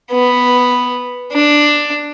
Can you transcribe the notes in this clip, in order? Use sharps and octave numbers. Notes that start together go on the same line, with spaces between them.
B3
D4